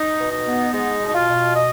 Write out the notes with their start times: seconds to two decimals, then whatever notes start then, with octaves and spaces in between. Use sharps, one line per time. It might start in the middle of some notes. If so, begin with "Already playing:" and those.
Already playing: D#4
0.19 B2
0.32 D#4
0.46 B3
0.73 G#3 D#4
1.00 B2
1.07 D#4
1.15 F4
1.29 B2
1.56 D#5